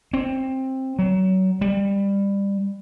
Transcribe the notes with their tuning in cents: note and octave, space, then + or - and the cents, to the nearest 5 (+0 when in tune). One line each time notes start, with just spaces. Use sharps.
C4 +15
F#3 +25
G3 +20